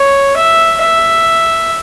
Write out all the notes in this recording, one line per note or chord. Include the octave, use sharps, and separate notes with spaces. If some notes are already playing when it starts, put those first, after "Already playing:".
Already playing: C#5
E5
E5